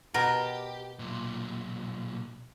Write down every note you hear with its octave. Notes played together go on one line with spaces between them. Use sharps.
B2 G4 A#4
B1 A#2